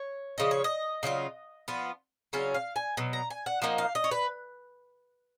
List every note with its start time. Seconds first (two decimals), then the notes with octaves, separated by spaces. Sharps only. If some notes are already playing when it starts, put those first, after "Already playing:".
Already playing: C#5
0.38 C#3 F3 D#5
0.51 C#5
0.64 D#5
1.03 C#3 F#3 C#4 F4
1.68 F3 B3 F4
2.33 C#3 F#3 C#4 F4
2.54 F5
2.76 G#5
2.97 B2 F#3
3.13 A#5
3.30 G#5
3.46 F#5
3.62 F3 A#3 D#4 F#5
3.78 F5
3.95 D#5
4.04 C#5
4.11 B4